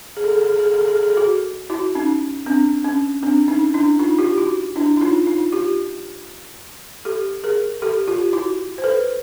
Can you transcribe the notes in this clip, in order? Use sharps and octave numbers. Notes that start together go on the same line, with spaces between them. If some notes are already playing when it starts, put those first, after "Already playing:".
G#4
A4
G#4
A4
G#4
A4
G#4
A4
G#4
A4
G#4
A4
G#4
A4
F#4 G#4
E4 F#4
C#4 D#4
C4 D4
C#4
C4 D4
C#4 D#4
D4 E4
D#4 F4
F4 G4
E4 F#4
D4 E4
E4
D#4 F4
D#4 F4
F4 G4
G4 A4
G#4 A#4
G4 A4
F4 G4
E4 F#4
C5
A4 B4